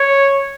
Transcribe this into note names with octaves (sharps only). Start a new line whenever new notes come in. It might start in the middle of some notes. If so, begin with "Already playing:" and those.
Already playing: C#5